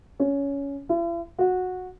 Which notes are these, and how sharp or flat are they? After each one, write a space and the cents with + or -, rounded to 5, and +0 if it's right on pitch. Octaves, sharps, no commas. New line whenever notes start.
C#4 +15
E4 +45
F#4 -15